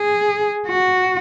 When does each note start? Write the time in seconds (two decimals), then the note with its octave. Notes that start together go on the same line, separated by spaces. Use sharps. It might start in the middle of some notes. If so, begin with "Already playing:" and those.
Already playing: G#4
0.67 F#4